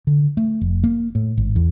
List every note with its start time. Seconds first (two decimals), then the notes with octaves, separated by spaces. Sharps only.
0.07 D3
0.37 A3
0.61 F1
0.84 A#3
1.15 A2
1.37 G#1
1.56 E2